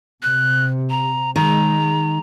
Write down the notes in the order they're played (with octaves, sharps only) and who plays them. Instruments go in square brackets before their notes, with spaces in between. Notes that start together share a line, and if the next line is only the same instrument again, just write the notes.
[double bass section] C3 [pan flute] F#6
[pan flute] A#5
[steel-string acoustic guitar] D#3 [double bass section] G#3 [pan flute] A#5